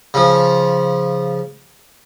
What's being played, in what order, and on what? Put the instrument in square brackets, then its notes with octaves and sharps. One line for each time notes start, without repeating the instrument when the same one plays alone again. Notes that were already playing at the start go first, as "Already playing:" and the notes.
[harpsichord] C#3 F3